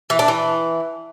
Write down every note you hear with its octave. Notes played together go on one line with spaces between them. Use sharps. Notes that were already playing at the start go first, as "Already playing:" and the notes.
E3
D4
E3